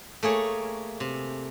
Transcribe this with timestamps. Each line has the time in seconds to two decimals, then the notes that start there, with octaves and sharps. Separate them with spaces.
0.23 A3 A#3 G#4 C#5
1.00 C3